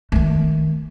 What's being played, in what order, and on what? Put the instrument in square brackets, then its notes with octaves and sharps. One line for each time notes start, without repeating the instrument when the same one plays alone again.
[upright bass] D#3 A3